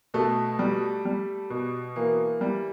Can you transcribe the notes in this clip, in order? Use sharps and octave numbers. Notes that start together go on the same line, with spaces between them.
B2 A3
G3
G3
B2
E3 A#3
G3